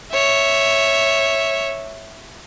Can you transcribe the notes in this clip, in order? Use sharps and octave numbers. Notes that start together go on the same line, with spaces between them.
C#5 E5